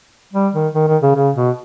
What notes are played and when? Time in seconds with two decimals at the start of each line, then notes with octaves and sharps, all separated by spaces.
0.34 G3
0.54 D#3
0.75 D#3
0.88 D#3
1.02 C#3
1.15 C#3
1.36 B2